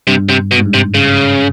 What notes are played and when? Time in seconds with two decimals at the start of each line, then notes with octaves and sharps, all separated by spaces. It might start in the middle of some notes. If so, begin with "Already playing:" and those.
0.07 G2 C3
0.29 C3
0.51 B2
0.58 G#2
0.66 G2
0.74 C3
0.94 C#3